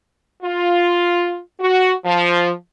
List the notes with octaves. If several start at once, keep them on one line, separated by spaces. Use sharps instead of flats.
F4
F#4
F3